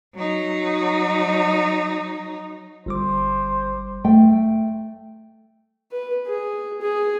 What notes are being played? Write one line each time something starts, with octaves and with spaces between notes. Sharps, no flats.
F#3 D#4
G1 G3 C5 D6
A3 G5
B4
G#4
G#4